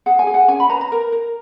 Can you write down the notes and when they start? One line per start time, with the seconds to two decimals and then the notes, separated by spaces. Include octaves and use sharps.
0.06 G#4 F#5
0.19 G#5
0.27 G#4
0.34 F#5
0.48 C#4 G#5
0.60 B5
0.70 B4 A#5
0.81 A#5
0.92 A#4
1.12 A#4